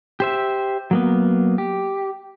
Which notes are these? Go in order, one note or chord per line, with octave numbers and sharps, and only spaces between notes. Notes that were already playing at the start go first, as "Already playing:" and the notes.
G4 C5 E5
F#3 A#3 B3
G4